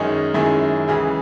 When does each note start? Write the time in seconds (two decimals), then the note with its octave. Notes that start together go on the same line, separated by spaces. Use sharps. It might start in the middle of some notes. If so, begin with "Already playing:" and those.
Already playing: F#2 D#3 G#3 C#4 D#4
0.34 F#2 D#3 G#3 C#4 E4
0.88 C#2 C#3 E3 G#4